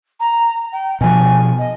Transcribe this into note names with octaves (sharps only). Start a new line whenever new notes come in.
A#5
G5
B2 F3 G#5
D#5